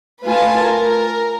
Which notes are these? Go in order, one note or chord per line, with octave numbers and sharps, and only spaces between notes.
A3 F4 B4 G#5 A5
A#4